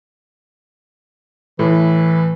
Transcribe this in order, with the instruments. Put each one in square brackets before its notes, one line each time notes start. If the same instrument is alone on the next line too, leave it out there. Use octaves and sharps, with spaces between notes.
[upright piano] A2 [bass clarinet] E3